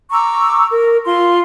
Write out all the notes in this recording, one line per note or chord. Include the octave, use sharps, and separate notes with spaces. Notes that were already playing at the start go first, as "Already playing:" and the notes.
A#5 C#6 D6 E6
A#4
F4 C6